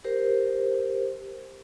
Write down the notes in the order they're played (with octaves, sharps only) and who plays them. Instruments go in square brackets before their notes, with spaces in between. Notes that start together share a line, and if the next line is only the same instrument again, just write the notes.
[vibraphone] G4 A#4 C5